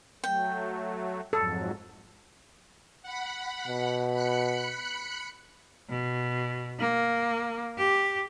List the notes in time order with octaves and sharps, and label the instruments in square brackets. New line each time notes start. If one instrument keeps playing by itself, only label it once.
[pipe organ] F#3 A3 [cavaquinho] G5
[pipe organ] F2 G#2 F#3 [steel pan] A4
[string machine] F#5 B5
[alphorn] B2
[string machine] B5 F#6 C#7
[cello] B2
A#3
G4